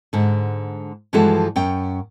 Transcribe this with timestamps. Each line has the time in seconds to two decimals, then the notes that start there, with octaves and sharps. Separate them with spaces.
0.13 G#2 D3
1.13 G2 E3 F3 G#3 F#4 A4
1.56 F#2 C#4 G5